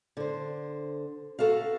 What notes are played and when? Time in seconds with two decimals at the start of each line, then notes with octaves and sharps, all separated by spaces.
0.17 D3 C5
1.39 F#4 A4 B4 F5